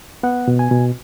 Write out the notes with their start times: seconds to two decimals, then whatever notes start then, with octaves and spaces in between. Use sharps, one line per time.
0.23 B3 F#5
0.48 B2
0.59 G#5
0.71 B2